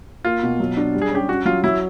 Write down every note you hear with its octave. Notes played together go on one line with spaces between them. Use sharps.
A#3 F4
B2
F#3
D4
G3
G#4
C#4 G4
C#4 F#4
F#3 F4
F#3 E4